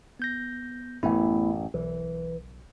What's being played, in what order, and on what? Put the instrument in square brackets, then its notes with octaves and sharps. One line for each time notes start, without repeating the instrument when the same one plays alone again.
[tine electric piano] B3 G6 A#6
[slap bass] A1 F#2 [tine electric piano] A3 B3 E4
[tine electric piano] B1 [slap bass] E3